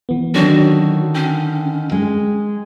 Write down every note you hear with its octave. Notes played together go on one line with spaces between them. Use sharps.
E3 B3
D3 D#3 F#3 C#4 D4 F#4
C#4 G5
G#3